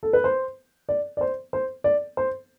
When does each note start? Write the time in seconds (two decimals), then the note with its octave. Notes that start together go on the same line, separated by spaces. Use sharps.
0.03 A4
0.13 B4
0.24 C5
0.89 D5
1.17 D5
1.21 C5
1.53 C5
1.84 D5
2.17 C5